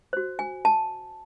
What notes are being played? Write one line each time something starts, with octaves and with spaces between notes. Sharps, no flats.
F#4 C5
G#5
A5